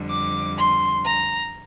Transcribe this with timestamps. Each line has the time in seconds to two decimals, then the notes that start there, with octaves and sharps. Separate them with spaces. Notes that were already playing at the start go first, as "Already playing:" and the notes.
Already playing: F2 D3 G3
0.10 D6
0.58 C6
1.05 A#5